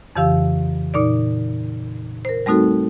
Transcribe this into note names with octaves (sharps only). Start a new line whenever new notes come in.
F2 C#3 E3 G4 F5 E6
A#2 D#4 D5
A#4 C5
G3 A3 C4 D#4 F#4 A4